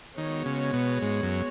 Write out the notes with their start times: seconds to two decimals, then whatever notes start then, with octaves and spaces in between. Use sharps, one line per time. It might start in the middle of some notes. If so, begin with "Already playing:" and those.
0.17 D#3 G#3 B3 F#4 C#5
0.46 C#3
0.73 B2
1.02 G#2
1.23 F#2